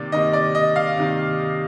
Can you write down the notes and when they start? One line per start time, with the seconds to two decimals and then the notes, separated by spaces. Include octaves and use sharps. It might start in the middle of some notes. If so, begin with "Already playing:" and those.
Already playing: C3 D#3 A#3 D5
0.12 C3 D#3 A#3 D#5
0.33 D5
0.55 D#5
0.76 F5
0.97 C3 D#3 A#3